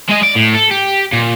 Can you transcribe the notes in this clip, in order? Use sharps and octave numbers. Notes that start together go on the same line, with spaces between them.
G#3 D#5
D5
A2
A4
G4
A#2